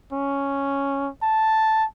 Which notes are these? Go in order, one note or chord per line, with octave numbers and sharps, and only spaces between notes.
C#4
A5